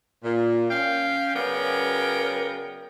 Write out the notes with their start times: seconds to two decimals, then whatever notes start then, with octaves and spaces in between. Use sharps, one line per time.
0.24 A#2
0.71 C#4 F5 G5
1.35 C#3 F#3 B3 A#4 D5 G5